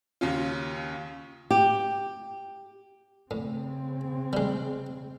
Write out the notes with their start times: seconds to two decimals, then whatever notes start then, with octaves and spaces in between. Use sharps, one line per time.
0.21 D#2 C#3 C#4 F4
1.51 G4
3.31 A2 C#3 C4
4.33 G3 G#3